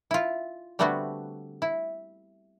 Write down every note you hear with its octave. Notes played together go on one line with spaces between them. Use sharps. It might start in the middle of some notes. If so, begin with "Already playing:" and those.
E4 F4
D3 G3 A3 B3 C4 F#4
E4